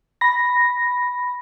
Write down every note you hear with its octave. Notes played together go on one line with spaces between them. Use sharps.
B5 A#6